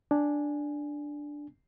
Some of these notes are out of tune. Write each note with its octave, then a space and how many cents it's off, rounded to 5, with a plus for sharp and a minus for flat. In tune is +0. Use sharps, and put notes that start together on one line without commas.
D4 +0 G#5 +0